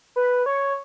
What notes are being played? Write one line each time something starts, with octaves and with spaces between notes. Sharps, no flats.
B4
C#5